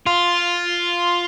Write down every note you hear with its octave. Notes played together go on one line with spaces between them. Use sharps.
F4